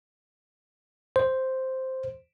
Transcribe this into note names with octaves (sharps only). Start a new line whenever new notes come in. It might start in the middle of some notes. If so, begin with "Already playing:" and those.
C5